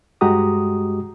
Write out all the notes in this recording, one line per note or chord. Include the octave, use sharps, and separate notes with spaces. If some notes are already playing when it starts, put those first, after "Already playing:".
G2 G#3 F#4 G4 A#5 D#6